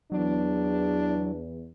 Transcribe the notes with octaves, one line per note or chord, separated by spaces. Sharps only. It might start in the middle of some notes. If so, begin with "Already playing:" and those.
E2 F#3 D4